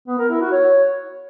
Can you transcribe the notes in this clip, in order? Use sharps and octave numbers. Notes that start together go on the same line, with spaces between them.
B3
A#4
E4
F#4
C#5